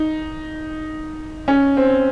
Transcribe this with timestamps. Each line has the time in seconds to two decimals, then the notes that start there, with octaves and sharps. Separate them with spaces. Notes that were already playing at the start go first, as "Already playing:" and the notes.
Already playing: D#4
1.48 C#4
1.77 C4